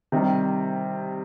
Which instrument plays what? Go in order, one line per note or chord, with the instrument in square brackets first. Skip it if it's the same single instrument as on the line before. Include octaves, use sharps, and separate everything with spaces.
[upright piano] C3 D#3 G3